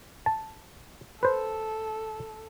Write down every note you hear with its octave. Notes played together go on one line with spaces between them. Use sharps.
A5
A4 B4 C5